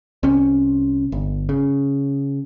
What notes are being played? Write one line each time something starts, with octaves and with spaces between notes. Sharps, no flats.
C2 C3 C#4
G1
C#3